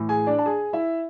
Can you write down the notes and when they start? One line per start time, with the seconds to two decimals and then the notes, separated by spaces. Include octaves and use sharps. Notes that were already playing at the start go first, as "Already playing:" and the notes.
Already playing: A2 E3
0.09 G#4 G#5
0.27 D4 D5
0.38 A5
0.46 G#4 G#5
0.73 E4 E5